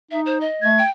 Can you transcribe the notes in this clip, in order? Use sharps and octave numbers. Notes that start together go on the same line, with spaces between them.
D#4 E5
C5
D#5
A3 G#6
G5